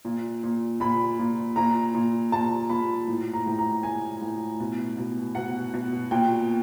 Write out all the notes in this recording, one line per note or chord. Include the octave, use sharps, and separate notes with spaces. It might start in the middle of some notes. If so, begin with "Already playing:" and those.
A#2
A#2
A#2 B5
A#2
A#2 A#5
A#2
A#2 A5
A#2 B5
A2
A#5
A2
A#5
A2 G#5
A2
B2
B2
B2 F#5
B2
A#2 G5